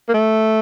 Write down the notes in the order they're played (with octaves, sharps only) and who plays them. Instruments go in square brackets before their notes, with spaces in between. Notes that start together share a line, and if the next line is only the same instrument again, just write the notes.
[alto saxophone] A#3
A3